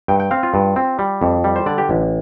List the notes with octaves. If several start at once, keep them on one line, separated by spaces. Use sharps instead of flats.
G2 G5
G5
C4 F5
F4
G2
C4
G3
F2
G3
C5
D3 D5
G4
A1